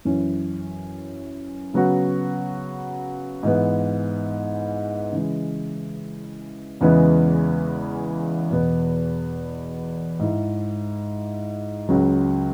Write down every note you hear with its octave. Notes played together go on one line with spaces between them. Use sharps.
F#2 E3 C#4 E4
C#3 F#3 B3 F#4
G#2 E3 B3
C#3 E3 G#3
E2 C#3 E3 G#3 B3
E2 B2 B3
G#2 G#3 E4
C#2 C#3 F#3